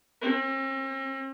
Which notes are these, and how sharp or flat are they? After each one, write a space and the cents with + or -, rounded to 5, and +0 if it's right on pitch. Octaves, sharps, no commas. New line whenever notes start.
C4 +45